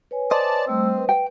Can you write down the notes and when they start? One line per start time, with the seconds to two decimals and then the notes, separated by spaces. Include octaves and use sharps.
0.11 B4 C#5 G#5
0.31 C5 D5 D#5 A5
0.67 G3 A3 C4 E6
0.98 B4
1.09 G5